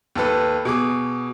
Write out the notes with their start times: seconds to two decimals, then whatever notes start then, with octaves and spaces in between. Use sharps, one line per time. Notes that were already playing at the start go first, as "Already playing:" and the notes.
0.16 D#2 A4 B4
0.65 B2 G#4 D6